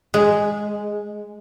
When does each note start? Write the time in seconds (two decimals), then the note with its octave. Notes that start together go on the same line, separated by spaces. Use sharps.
0.14 G#3